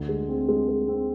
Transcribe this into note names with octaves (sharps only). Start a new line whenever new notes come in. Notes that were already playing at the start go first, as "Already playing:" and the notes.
Already playing: D2
G#3
C4
G#3
G#3
C4